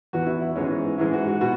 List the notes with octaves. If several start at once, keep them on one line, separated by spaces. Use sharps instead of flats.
E2 E3 B3 F#4
E4
E4
G#2 E3 G#3 B3 C#4
G#2 E3 G#3 E4
F#4
F#4
B2 F#4